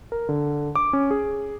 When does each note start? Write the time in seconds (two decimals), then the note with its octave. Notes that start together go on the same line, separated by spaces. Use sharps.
0.12 A#4
0.29 D3
0.75 D6
0.93 C#4
1.11 G#4